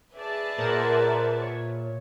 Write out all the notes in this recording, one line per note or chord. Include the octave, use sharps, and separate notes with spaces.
G#4 B4 D5 E5 A5
A#2 A#4 C5 F#5
C#5